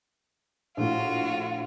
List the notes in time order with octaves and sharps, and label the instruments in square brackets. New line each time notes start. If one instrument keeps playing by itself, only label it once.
[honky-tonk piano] A#1 A2 [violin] F4 F#4